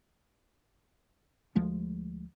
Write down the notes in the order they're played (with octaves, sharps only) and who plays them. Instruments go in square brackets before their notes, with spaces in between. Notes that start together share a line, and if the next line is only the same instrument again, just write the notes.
[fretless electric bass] D2 F3 G#3 A3